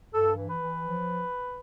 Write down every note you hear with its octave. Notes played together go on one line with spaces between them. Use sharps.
G2 A4
E3
B4
E3
F3